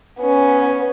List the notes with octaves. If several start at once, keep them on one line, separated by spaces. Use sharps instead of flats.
B3 C#4